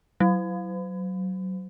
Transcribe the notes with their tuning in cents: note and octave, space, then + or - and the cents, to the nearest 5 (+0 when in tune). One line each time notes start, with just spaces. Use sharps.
F#3 +15